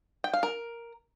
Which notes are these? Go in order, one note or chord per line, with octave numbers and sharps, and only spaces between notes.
G5
F5
A#4